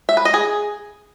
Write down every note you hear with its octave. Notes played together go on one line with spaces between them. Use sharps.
E5
B4
D#5
G#4